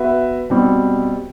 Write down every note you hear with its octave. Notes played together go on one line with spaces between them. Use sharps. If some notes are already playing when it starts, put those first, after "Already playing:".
Already playing: B3 F#4 B4 E5
B2 G3 C4 G4